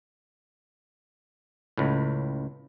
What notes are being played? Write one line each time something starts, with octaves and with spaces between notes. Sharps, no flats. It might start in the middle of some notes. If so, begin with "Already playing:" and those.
C#2 A2